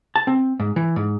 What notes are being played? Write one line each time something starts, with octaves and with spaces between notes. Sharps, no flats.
A5
C4
G#2
E3
G#2